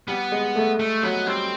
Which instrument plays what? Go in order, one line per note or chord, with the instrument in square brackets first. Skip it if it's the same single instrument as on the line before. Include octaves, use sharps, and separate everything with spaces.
[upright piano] G3 [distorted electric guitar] B3
[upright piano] G#3
A3
[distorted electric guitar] A3
[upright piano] F#3 [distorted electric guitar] B3
[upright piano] G3 [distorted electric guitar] C4